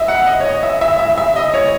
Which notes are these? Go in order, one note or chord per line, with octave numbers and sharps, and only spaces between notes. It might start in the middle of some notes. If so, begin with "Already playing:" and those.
Already playing: D#5 E5
F#5
D#5
C#5
D#5
E5
E5
E5
E5
D#5
C#5